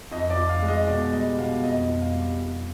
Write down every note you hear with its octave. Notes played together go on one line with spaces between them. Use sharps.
F2 D#5
D5
F2
F5
G#3
D#5
B2 D5
G3 D#5
B2 F5
F2 D#5
F2
F5
G3
F2